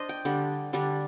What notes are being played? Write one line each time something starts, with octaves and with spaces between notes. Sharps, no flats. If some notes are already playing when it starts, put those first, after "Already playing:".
Already playing: D4 C5 D#5
G5
D3 G3 D4
D3 G3 D4